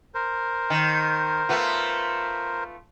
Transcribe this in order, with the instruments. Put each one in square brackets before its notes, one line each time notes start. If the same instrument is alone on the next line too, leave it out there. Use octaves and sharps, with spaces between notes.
[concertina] A#4 C5
[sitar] D#3
A3 B3 F4